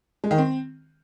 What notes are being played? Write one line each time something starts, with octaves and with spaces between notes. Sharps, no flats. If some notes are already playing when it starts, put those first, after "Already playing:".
G#3
D#3
C4